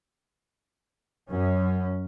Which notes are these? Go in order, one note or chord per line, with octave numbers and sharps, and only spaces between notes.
F#2 C#4